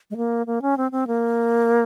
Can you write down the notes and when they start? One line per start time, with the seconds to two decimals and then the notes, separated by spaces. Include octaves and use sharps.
0.11 G#3
0.17 A#3
0.47 A#3
0.62 C#4
0.77 C4
0.92 C4
1.07 A#3